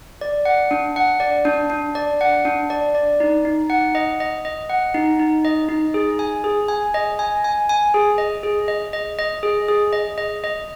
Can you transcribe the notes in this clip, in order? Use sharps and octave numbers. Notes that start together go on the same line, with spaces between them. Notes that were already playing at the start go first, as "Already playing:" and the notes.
D5
F#5
D4
F#5
D5
D4
D4
D5
F#5
D4
D5
D5
D#4
D#4
F#5
D#5
D#5
D#5
F#5
D#4
D#4
D#5
D#4
G#4
G#5
G#4
G#5
D#5
G#5
G#5
G#5
G#4
D#5
G#4
D#5
D#5
D#5
G#4
G#4
D#5
D#5
D#5